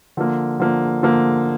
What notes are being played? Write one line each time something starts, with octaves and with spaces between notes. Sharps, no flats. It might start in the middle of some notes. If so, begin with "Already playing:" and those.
D3 F3 A#3
D3 F3 A#3
D3 F3 A#3